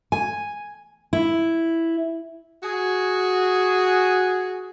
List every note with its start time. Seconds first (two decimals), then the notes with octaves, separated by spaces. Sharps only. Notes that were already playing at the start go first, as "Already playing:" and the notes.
0.12 G#5
1.13 E4
2.63 F#4 G#4